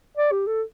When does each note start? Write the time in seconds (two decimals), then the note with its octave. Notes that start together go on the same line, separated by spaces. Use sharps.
0.17 D5
0.32 G4
0.47 A4